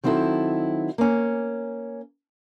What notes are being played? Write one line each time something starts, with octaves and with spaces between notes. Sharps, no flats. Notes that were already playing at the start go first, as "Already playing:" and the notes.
D#3 F#3 C4 D#4 E4 A4
A#3 C#4